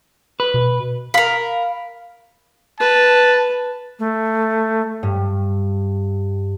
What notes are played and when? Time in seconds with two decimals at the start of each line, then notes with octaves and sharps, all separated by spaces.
0.40 B4
0.54 B2
1.14 A#4 F5 B5
2.80 B4 A5
3.99 A3
5.03 G2